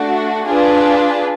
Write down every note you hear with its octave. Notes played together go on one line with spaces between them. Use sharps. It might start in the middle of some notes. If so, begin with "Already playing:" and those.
Already playing: A3 D4 F#4
D4 F4 G#4 B4